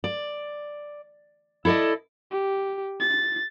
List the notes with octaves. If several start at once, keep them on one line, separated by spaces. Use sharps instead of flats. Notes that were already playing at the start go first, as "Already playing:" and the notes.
D5
E4 A4 D5 D#5
G4
A6